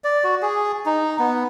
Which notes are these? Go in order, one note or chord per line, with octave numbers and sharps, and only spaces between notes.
D5
F#4
G#4
D#4
B3